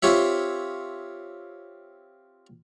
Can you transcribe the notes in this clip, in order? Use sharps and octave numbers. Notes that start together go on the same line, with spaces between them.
C4 F4 G4 C#5 E5